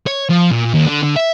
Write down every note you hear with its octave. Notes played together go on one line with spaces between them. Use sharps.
C#5
F3
A#2
D#2
D3
D3
E5